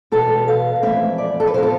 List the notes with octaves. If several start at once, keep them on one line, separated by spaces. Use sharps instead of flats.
E2 B2 B3 A4
F5
F2 E3 A3 C4 E5
D5
A4
B4
C3 F3 B3 C5
A4